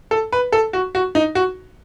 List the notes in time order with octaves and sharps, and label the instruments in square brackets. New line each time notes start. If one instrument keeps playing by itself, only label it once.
[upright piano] A4
B4
A4
F#4
F#4
D#4
F#4